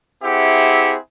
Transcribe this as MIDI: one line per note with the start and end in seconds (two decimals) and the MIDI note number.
0.24 0.96 60
0.24 0.96 64
0.24 0.96 67
0.24 0.96 68
0.24 0.96 76
0.24 0.96 78